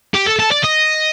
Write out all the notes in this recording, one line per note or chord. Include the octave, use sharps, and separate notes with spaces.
G4
A4
A4
D5
D#5